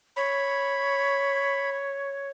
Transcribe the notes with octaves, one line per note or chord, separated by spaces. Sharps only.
C#5 B5